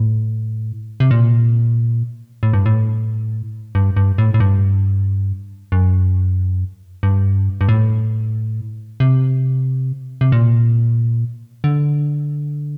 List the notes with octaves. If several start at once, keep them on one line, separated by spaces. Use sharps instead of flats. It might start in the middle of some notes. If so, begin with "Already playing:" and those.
Already playing: A2
C3
A#2
A2
G2
A2
G2
G2
A2
A2
G2
F#2
G2
G2
A2
C3
C3
A#2
D3